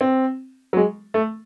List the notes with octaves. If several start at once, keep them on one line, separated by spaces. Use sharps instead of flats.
C4
F#3
G#3
A3